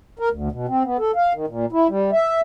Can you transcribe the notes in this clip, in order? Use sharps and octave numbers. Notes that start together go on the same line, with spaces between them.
A#4
D2
B2
C4
B3
A4
F5
D#3
A#2
E4
G3
E5